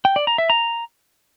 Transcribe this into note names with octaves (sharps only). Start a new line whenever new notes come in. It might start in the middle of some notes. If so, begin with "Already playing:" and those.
G5
D5
A#5
E5
A#5